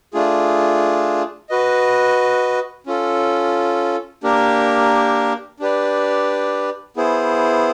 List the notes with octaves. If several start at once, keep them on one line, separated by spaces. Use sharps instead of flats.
A3 D4 F4 G#4
F#4 B4 D#5
C#4 F4 A4
A#3 D4 G4 A#4
D4 G4 B4 D5
B3 E4 G#4 C5